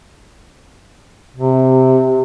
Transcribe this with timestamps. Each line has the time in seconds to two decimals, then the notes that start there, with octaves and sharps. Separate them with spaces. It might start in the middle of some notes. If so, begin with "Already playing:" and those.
1.36 C3